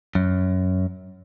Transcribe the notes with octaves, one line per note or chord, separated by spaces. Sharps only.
F#2